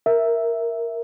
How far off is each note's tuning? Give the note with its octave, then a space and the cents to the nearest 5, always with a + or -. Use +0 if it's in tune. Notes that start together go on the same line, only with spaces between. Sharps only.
A#4 +0 E5 +0